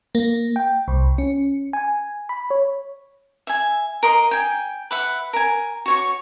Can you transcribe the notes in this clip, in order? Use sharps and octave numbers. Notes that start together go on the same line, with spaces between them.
A#3
G5
C2
C#4
G#5
B5
C#5
E5 G#5
A#4 D#5 C6
G5 G#5
B4 E5 F#5
A#4 G#5
F#4 C#5 C#6